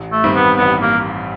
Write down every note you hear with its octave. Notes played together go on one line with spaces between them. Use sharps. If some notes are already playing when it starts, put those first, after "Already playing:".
Already playing: A1
A3
G2 D#3 G3 C4
B3
A1 B3
A#3